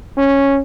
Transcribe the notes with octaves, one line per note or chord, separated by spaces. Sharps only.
C#4